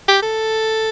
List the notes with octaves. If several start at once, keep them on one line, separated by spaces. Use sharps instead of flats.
G4
A4